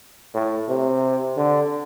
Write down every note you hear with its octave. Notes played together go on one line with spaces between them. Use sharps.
A2
C3
D3